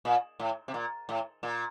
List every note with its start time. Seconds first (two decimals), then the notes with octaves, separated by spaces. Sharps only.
0.05 A#2
0.40 A2
0.68 C3
0.74 A#2
1.09 A2
1.43 A#2